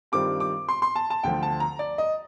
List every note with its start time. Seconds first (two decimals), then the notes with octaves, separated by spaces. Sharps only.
0.12 G2 D#3 G3 C4 F4 D6
0.40 D6
0.69 C6
0.82 C6
0.96 A5
1.10 A5
1.23 D2 D3 F3 G5
1.43 A5
1.60 A#5
1.79 D5
1.98 D#5